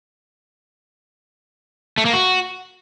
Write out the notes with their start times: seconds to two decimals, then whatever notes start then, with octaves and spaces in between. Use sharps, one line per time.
1.98 A3
2.05 A#3
2.13 F#4